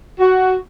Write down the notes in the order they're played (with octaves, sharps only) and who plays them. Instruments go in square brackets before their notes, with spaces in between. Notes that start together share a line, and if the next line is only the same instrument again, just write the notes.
[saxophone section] F#4